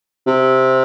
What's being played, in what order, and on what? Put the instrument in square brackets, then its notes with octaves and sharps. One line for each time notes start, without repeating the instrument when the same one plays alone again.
[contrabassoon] C3